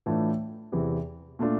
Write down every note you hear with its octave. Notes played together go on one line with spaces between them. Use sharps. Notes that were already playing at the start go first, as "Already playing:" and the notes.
A2 E3 A3 D4 F4
E2 C3 E3
A#2 A3 D4 F4